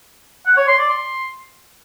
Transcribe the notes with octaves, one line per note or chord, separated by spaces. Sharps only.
F#5
C#5
C6
D5
C6